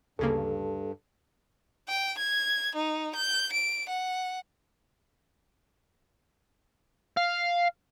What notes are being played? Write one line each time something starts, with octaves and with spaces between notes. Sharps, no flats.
D2 G2 C#3 A#3 A4
G5
G#6
D#4
G6
D7
F#5
F5